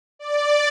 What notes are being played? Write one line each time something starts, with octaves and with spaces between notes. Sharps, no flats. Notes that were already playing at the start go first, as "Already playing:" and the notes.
D5